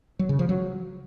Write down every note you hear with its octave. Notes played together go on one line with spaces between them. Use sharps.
F#3
C#3
F3
F#3